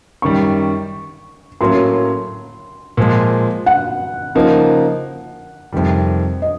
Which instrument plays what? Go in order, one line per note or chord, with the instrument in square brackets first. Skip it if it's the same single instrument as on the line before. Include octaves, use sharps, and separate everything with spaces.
[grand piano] F#2 D#3 G3 [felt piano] C#6
[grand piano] A2 F#3 A#3 C#4 [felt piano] C6
[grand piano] A#2 F3 G#3
[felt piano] F#5
[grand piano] C#3 F3 A#3 D#4
F2 C3 D#3 G3
[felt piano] D#5